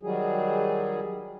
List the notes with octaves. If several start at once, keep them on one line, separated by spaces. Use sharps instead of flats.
D#3 F#3 G3 G#4